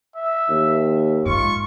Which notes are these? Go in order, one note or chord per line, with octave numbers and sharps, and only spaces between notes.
E5
D#2
G#2 F4 C#6